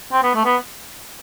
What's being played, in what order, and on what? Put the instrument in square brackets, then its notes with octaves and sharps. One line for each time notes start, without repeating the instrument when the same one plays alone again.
[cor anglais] C4
B3
A3
B3